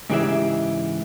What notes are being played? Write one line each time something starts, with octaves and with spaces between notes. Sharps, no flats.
G#2 C#3 E3 G4 G#4 E5